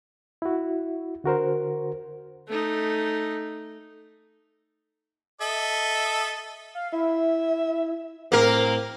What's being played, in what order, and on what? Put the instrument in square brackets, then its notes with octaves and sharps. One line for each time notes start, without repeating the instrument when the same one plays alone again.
[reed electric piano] E4 F#4
D3 F#4 A#4 C5
[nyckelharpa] A3 D#4
[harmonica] A4 D#5 E5
[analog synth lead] F5
[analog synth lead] E4 [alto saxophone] E5
[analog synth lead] A2 [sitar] A#3 A#4 [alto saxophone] C4